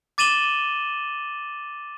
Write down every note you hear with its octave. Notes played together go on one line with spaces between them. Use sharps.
D6 A6 D#7 E7 F#7 G7